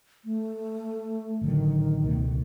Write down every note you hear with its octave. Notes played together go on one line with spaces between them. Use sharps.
A3
A1 D3 D#3 F#3
C#2 B2 A3